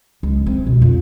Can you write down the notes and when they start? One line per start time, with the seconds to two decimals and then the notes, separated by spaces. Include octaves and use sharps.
0.23 C#2
0.46 C4
0.66 B2
0.82 F2